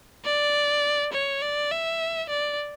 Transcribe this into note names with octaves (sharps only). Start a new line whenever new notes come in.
D5
C#5
D5
E5
D5